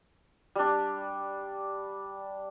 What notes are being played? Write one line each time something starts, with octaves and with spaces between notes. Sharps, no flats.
G3 D4